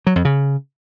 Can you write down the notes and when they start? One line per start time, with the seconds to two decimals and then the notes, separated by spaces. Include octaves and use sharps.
0.07 F#3
0.16 F2
0.25 C#3